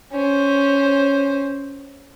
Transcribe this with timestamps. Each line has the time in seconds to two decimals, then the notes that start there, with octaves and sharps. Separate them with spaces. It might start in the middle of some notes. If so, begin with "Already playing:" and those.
0.13 C#4 C5